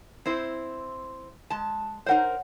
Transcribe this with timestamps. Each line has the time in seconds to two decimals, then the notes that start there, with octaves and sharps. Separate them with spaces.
0.26 C4 E4 C5
1.50 G#3 A5
2.06 D#4 A#4 C5 C#5 F#5